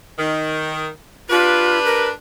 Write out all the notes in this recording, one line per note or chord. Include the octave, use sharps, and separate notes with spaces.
D#3
D4 F4 G4 B4
A#4